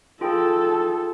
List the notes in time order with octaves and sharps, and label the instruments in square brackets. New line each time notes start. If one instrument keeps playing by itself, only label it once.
[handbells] F4 G#4 G5 [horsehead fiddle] A4